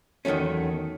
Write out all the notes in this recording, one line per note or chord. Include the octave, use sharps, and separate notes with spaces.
E2 D#3 F#3 A3 C#4